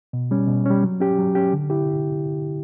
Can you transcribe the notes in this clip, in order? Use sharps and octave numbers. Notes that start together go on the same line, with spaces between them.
B2
G3 C#4
B2
G3 C#4
F#3
C#4 G4
F#3
C#4 G4
D3
E4 G4